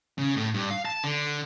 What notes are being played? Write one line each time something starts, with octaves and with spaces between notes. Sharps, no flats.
C#3
A2
G2
F5
A5
D3